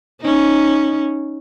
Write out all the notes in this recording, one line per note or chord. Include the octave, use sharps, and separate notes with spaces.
C#4 D#4